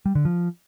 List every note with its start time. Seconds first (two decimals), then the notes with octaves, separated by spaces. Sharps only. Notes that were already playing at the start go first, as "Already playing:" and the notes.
0.06 G3
0.15 D3
0.25 F3